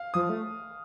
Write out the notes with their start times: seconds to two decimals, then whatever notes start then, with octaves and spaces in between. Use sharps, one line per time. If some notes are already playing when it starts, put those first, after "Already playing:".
Already playing: F5
0.14 F3 D#6
0.30 A3